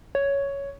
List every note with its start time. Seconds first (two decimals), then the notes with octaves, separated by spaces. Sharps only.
0.15 C#5